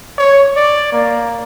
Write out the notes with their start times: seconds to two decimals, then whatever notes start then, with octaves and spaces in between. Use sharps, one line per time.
0.18 C#5
0.57 D5
0.92 A#3